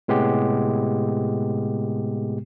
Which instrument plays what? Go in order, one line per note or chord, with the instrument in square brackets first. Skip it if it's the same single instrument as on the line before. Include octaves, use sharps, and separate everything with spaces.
[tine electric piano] A2 C3 G#3 B3 G4